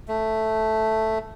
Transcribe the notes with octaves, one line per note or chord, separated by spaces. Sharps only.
A3